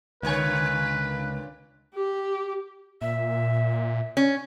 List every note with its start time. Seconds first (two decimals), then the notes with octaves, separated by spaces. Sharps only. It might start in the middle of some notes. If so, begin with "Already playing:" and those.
0.23 C#2 A#2 D3 B4 C#5 G#5
1.95 G4
3.01 A#2 E5
4.17 C#4